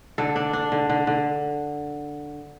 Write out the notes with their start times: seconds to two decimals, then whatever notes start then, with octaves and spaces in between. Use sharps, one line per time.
0.18 D3 A4
0.36 D4
0.53 D4
0.72 D3
0.89 D3
1.07 D3